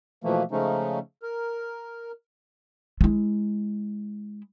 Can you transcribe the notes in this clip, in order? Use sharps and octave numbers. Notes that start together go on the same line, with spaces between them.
B2 E3 F3 A3 A#3
C#3 F3 G#3 A3 C#4 D#4
A#4
G#3 E4